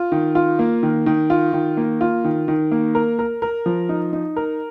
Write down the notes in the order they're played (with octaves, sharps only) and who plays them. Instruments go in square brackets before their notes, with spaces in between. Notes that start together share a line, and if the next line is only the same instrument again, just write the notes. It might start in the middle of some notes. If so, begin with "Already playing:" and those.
Already playing: [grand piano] F4
D#3
F4
A#3
D#3
D#3
F4
D#3
A#3
F4
D#3
D#3
A#3
A#4
A#4
A#4
F3
D#4
D#4
A#4